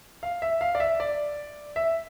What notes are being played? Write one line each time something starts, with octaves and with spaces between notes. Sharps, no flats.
F5
E5
F5
D5
E5
D5
E5